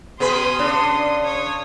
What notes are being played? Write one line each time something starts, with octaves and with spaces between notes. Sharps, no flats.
B2 G#4 B4 C6 D#6
C#3 D4
C#5 D#6